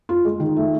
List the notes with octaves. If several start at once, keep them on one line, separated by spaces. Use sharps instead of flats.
F4
G#3
D#3
A3